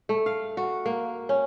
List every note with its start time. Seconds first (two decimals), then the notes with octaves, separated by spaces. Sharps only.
0.09 A3
0.26 F5
0.57 F#4
0.86 A#3
1.29 C#4